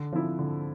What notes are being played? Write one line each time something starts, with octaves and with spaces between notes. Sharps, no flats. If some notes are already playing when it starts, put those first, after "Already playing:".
Already playing: D3
F3 C4 E4
D3